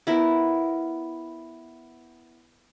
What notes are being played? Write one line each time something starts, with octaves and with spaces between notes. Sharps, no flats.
B3 E4 A#4